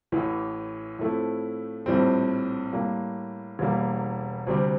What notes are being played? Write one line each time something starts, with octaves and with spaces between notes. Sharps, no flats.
A1 A2 E3
A2 F3 A3 C4 E4
A#1 A2 G3 C4
A2 G3 A#3
E1 E2 E3 G3 A#3
D2 C3 G3 C4